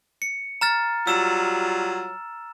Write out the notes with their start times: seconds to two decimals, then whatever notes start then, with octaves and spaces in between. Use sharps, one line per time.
0.22 C#7
0.61 A#5 F6 A6
1.07 F#3 G3 F4 E6 E7